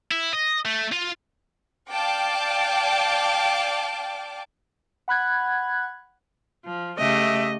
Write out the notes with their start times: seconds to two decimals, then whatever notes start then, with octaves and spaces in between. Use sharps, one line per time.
0.11 E4
0.34 D#5
0.65 A3
0.92 F4
1.92 D5 F5 G5 A5 D6
5.08 F#5 B5 F#6 G#6
6.65 F3
6.99 C#3 A3 G4 D#5 E5